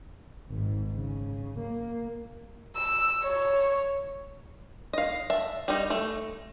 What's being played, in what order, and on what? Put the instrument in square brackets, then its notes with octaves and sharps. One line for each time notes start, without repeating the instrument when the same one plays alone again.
[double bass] G#1 G#2
C#3
A#3
[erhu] E6
C#5
[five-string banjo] D#5 F5
E5 A5
G3 D#4
A3